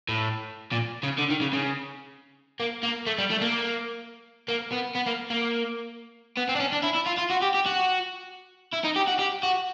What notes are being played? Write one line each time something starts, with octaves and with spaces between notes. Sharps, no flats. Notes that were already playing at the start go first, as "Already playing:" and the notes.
A2
A#2
C#3
D3
D#3
C#3
C#3
A#3
A#3
A3
G3
A3
A#3
A#3
B3
B3
A#3
A#3
B3
C4
D4
C#4
D4
E4
E4
F4
F4
F#4
G4
G4
F#4
E4
D#4
G4
F#4
G4
F#4